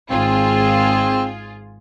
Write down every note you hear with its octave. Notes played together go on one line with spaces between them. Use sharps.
G#1 C4 F4 G#4